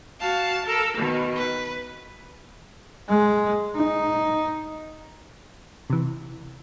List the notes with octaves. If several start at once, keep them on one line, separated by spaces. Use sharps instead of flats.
F#4 F5 A5
A4 A#4
B2 D#3
B4
G#3
D#4
C3 E3